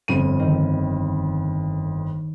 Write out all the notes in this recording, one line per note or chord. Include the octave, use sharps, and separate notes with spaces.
G1 F2 D#7
D#3